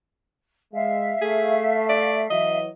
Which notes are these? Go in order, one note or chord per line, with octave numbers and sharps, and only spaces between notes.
G#3 E5 F5
A3 G#4
D5
E3 F#3 D#5